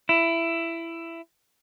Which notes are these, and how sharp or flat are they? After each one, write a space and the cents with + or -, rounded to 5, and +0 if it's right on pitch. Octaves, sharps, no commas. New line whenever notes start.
E4 +15